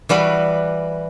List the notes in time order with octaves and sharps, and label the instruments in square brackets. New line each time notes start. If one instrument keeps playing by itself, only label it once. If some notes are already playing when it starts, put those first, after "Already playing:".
[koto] E3 G3 F#4 B4